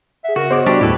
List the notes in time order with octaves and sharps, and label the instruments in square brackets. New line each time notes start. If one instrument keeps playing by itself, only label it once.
[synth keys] G#4 F#5 [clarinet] E5
[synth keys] C#3 [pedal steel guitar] F#4 [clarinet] A#4
[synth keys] B3 C#5 E7 [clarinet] G#4 [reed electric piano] C5 D#5 D6
[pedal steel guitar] G3 D4 G4 [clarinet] F#4
[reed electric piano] D#2 A2 [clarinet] E4 [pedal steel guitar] G4 A4 B4